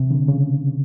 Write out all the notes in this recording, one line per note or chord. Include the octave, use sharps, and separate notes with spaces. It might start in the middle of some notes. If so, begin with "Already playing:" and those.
Already playing: C3
D3
C#3